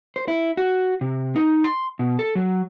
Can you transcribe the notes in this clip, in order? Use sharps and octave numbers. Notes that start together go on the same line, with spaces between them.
C5
E4
F#4
C3
D#4
C6
B2
A4
F#3